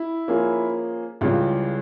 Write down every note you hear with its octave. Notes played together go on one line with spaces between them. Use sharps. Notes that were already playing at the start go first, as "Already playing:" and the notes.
Already playing: E4
F3 A#3 C#4 F4 G#4
C#2 C#3 E3 G3 F4